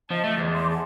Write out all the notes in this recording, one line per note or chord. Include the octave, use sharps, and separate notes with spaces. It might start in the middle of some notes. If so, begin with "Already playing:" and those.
F3 D#5 A5
A3
E2
C6 D6
G#4 A5